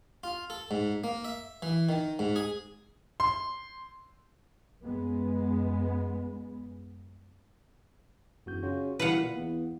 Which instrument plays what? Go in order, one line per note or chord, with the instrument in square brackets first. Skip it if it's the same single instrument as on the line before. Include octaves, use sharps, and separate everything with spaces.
[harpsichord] F4
A4
G#2
A#3
E5
E3
D#3
G#2
G#4
[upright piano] C6
[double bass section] F#2 G#3 B3
[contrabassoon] E1 [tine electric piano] F#2 F#4 G6
[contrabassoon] C#3 [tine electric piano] F4 F#4
[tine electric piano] B2 D3 G3 [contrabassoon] E3 [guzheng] B4 F5 F#5
[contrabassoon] A#2 [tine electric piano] E4
[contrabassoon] E2 [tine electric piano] B3